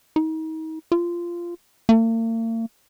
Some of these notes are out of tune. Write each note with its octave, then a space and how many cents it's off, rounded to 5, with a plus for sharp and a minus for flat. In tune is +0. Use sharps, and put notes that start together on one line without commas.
D#4 +35
F4 -15
A#3 -45